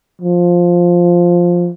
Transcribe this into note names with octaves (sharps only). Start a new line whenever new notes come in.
F3